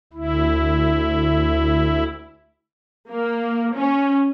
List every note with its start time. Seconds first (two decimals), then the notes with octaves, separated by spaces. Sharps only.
0.13 D2 E4
3.10 A#3
3.75 C#4